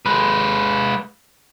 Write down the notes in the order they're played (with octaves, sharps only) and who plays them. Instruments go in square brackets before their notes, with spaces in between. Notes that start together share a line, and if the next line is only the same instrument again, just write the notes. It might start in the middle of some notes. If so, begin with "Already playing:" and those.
[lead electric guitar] G#3 B4